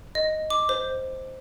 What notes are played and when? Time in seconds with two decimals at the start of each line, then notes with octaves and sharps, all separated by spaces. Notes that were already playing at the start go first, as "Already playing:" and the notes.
0.15 D#5
0.50 D6
0.69 C5